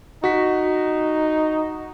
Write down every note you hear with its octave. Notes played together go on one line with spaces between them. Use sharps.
D#4 F#4 B6